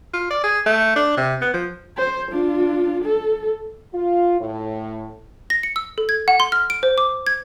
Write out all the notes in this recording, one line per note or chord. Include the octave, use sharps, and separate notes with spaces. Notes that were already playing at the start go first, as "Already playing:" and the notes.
F4
D5
G#4
A3
D4
C3
B3
F3
C5
D4 F4
A4
F4
A2
A#6
C#7
E6
A4
G#6
F#5
C6
F6
D7
C5
D6
G#6